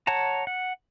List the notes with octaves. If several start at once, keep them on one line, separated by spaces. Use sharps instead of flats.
C#5 F#5 A5 A#5
F#5